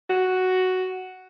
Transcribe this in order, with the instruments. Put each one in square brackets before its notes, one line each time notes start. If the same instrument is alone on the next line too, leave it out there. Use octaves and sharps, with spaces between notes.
[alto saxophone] F#4